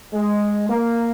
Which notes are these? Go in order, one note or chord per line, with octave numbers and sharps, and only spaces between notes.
G#3
A#3